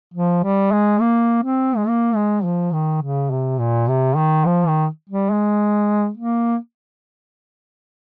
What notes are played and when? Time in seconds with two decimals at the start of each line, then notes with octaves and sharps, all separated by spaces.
0.14 F3
0.44 G3
0.72 G#3
1.01 A#3
1.43 C4
1.76 G#3
1.88 A#3
2.15 G#3
2.44 F3
2.73 D#3
3.02 C#3
3.31 C3
3.60 A#2
3.88 C3
4.16 D#3
4.45 F3
4.67 D#3
5.09 G3
5.31 G#3
6.17 A#3